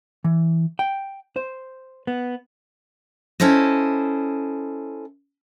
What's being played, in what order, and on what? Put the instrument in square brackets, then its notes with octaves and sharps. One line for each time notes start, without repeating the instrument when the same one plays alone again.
[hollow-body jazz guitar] E3
G5
C5
B3
[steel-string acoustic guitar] C#4 E4 A4 C5 D#5